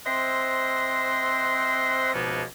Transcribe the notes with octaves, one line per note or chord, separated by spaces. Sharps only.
C4 C5 D#5 E5 F#5 C6
C#2 G#2 B2 F3 A#3 B3